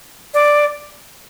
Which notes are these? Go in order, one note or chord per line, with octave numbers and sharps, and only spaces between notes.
D5